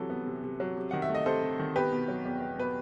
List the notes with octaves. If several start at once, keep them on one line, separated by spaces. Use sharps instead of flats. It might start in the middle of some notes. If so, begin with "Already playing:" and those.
Already playing: C3 E3 F#3 A4
B3
C3
C3
F#3
C3
D#3 F#5
E5
A3
D#5
C3 A4 C5
C3
D#3
B3 G4 B4
B2
F#3
E2
B3
B2 B4